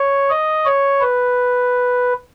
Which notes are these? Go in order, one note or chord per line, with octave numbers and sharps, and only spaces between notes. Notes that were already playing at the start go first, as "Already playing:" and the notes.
Already playing: C#5
D#5
C#5
B4